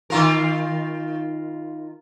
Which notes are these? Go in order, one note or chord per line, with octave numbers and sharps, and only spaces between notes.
D#3 F4 A#4